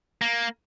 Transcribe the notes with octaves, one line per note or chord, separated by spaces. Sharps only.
A#3